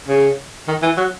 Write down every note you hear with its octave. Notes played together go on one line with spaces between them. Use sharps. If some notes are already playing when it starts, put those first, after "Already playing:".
C#3
D#3
E3
F#3